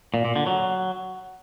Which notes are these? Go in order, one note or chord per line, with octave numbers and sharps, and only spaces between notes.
A#2
A#2
D3
F#3